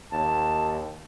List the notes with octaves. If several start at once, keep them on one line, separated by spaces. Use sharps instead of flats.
D#2 A5